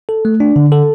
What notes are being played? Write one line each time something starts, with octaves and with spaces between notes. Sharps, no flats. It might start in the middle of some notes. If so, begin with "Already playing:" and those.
A4
A3
D4
D3
A4